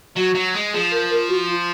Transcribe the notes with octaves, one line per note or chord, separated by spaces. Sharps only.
F#3 F#4
F#3
G#3
F3 G#4
A#4
A#4
F#4
F4